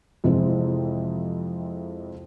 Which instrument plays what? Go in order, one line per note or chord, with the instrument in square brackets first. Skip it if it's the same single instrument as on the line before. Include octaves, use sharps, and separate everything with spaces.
[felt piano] F2 C3 E3 G#3 C4